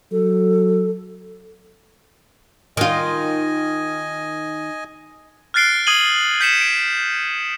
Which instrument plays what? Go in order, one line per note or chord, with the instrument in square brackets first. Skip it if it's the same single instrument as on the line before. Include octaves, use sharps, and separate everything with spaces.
[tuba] F#3 [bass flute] A4
[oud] D#3 F4 [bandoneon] D#5 G#5
[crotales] F6 F#6 A6 C7 D7 G7
D#6 G#6 C7 D#7 F#7 G7
G6 B6 C#7 E7
D7